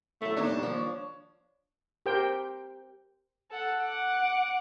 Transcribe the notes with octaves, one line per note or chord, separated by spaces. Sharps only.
F#3 A3 E4
E2 A#2 D4 D#4 C#5
G3
D#2 G#2 F3
C#5
G4 A#4 C5 G5
A4 F#5
F#5 D6